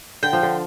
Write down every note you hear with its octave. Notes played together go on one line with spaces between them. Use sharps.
D3 G5
F3
D3